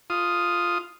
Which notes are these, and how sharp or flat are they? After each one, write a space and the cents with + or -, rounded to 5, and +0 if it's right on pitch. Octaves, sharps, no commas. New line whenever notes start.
F4 +0 D#6 +0